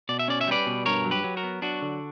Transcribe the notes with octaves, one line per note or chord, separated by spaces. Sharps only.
B2 D5
E5
C#4 D5
E5
G3 B4 D5
B2
G2 A#4 C#5
F#3
G4 B4
F#3
F#4 A#4
B3
F#3 D4 F#4
D3